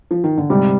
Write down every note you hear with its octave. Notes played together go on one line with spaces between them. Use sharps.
F3
D#3
D3
G#2 C3 G3